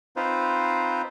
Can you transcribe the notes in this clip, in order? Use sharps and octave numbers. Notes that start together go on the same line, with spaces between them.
C4 D#4 F4 B4 C5